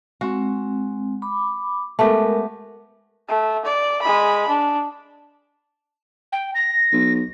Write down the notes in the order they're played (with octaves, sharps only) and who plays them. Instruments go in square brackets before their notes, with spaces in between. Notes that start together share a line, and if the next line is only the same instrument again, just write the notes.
[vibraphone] G#3 C4 [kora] F#4
[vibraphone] B5 D6
[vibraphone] G#3 A#4 [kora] A3 B3 G4
[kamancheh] A3
D5
G#3 B5
D4
[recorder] G5
A#6
[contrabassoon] B1